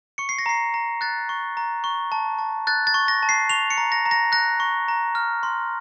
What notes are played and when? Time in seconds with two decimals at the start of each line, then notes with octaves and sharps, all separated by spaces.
0.18 C#6 C#7
0.29 C7
0.39 A#6
0.46 A#5 C7
0.74 A#5
1.01 F#6 A6
1.29 C#6
1.57 A#5
1.84 C#6
2.12 A5
2.39 A5
2.67 F#6 A6
2.87 A6
2.94 C#6
3.08 A#6
3.23 A5
3.29 C7
3.50 C#6 F7
3.70 C#7
3.78 A#5
3.92 A#6
4.06 A#5
4.11 A#6
4.32 F#6 A#6
4.60 C#6
4.88 A#5
5.15 F6
5.43 C6